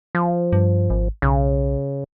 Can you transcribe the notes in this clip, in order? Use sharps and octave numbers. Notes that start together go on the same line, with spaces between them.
F3
G2
G#1
B1 C#3